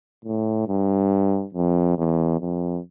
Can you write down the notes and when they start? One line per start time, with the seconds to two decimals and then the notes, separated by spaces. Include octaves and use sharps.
0.25 A2
0.68 G2
1.55 F2
1.98 E2
2.40 F2